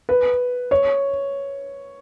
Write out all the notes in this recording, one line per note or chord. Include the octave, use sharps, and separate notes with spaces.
B4
C#5